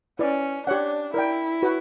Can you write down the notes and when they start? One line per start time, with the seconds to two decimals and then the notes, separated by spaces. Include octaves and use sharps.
0.19 C#4 E4 B4 D5
0.67 D4 G4 C#5 F#5
1.14 E4 A#4 D5 G5
1.63 F#4 B4 F#5